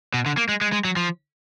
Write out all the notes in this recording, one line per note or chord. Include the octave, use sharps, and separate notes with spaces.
B2
D3
A#3
G#3
G#3
G#3
F#3
F3